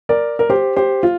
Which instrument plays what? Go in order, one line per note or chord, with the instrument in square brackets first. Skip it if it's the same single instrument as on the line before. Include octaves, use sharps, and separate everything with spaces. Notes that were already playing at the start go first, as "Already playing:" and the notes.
[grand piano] A#4 D5
A#4
G4 C5
G4 C5
F4